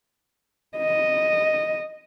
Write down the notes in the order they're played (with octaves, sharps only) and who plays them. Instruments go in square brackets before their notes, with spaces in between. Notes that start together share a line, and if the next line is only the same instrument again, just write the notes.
[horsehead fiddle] D#5